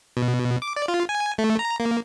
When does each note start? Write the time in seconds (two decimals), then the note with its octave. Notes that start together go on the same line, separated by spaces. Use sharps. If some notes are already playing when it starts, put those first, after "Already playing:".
0.17 B2
0.62 D6
0.76 D5
0.88 F4
1.09 G#5
1.38 A3
1.59 A#5
1.80 A#3